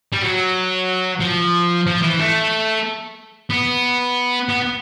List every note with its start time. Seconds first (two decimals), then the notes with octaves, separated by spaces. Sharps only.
0.13 G3
0.22 F#3
1.20 F3
1.87 F3
2.02 E3
2.19 A3
3.50 B3
4.49 B3